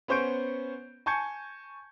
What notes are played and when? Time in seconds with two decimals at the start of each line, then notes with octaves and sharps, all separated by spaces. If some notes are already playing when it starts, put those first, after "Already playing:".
0.08 B3 C#4 C5 C#6 G6 D7
1.06 G#5 A5 C#6 G6 G#6 C#7